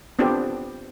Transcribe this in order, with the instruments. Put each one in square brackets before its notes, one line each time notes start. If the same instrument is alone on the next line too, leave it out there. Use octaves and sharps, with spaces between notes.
[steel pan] B3 C4 D4 F4 G4 A4